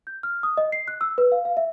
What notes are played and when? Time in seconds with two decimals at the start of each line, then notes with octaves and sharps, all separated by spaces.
0.07 G6
0.23 F6
0.43 D#6
0.57 D#5
0.72 C7
0.88 F#6
1.01 E6
1.18 B4
1.32 F5
1.45 F5
1.57 E5